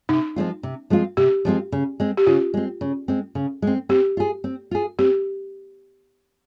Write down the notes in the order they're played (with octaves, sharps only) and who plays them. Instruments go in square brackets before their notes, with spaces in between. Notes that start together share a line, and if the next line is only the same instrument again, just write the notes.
[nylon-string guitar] C3 [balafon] D#4
[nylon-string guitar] F3 G#3 C4 F4
C3
F3 G#3 C4 F4
[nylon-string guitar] C3 [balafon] G4
[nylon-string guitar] F3 G#3 C4 F4
C#3
G#3 C4
[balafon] G4
[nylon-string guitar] C#3 [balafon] F4
[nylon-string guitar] G#3 C4
C#3
G#3 C4
C#3
G#3 C4
[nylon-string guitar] C4 [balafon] G4
[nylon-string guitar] F4 G#4
C4
F4 G#4
[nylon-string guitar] C4 [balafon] G4